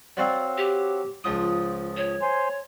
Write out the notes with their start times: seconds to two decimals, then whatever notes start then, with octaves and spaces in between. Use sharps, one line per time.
0.17 F#3 C4 D5 F5
0.58 G4
1.24 C#2 F3 F4 D#6
1.97 C#5
2.22 C5 G#5 C6